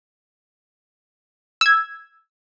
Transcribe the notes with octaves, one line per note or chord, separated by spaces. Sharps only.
E6 G#6